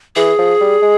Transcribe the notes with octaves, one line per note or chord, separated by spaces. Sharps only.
E3 G#4
F3
G3
G#3